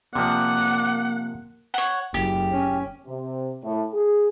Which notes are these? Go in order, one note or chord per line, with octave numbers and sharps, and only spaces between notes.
C3 F3 A#3 D5 F#5
C#5 F#5
F#1 G4
C#4
C3
A2
G#4